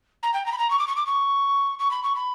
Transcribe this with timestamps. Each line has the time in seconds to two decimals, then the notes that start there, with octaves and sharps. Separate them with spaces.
0.23 A#5
0.34 G5
0.46 A#5
0.52 B5
0.58 A#5
0.70 C#6
0.79 D6
0.88 C#6
0.96 D6
1.06 C#6
1.79 C#6
1.91 B5
2.03 C#6
2.16 B5